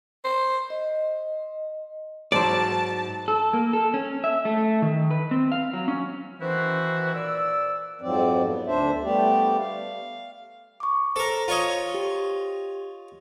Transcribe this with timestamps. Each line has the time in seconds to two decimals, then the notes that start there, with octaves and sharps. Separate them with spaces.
0.24 C5
0.70 D#5
2.32 G#2 F#3 C5 D5 A5
3.28 A4
3.53 A#3
3.73 A4
3.94 C#4
4.24 E5
4.45 A3
4.82 D#3
5.11 B4
5.31 C4
5.52 F5
5.74 F#3
5.88 C#4
6.40 D#3 E3 E4 F#4 C5
7.14 A#2 D5 E6
8.01 F2 G#2 F3 F#3 C4 D5
8.44 B3
8.66 D2 D4 C5 E5
9.03 G3 A3 B3 G4 D5
9.58 F5
10.80 C#6 D6
11.16 A4 A#4 C5 A#5
11.48 F4 C#5 D#5
11.94 G4